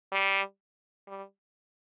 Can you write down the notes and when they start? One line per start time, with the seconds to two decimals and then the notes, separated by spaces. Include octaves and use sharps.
0.12 G3
1.08 G3